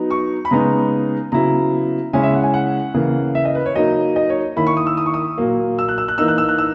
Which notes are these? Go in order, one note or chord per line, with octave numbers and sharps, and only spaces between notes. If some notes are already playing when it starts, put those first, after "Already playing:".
Already playing: F#3 B3 D#4
C#6
B5
C#3 G#3 B3 D#4 A#5
C#3 F#3 B3 E4 A#5
C#3 G#3 C#4 E4 G#5
E5
F#5
G#5
F#5
C#3 E3 A#3
E5
D#5
B4
C#5
F#3 A#3 D#4 D#5
D#5
C#5
D#3 A#3 E4 B5
C#6
D#6
E6
D#6
C#6
D#6
A#2 F#3 A#3
E6
F#6
E6
F#6
E3 A#3 D#4 E6
F#6
E6
F#6
E6